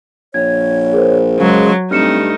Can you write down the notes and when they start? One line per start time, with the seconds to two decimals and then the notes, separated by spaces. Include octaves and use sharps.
0.34 A#1 C#5 G#6
0.93 G#4 A#4 C5
1.39 C#3 F#3 G#3
1.91 G2 A3 C4 D#4 F6 C#7 E7